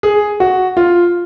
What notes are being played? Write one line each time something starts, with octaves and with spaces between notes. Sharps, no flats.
G#4
F#4
F4